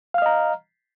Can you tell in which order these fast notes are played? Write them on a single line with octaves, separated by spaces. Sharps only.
F5 F6 D#5 A#5